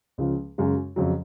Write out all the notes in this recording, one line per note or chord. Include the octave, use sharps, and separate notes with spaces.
C#2 C#3 F3
F#2 C#3 G#3
F2 C#3 F#3